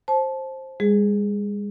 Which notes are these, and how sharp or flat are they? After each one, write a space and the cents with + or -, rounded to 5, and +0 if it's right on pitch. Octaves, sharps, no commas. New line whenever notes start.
C5 +15 A5 -20
G#3 -40 G#4 +0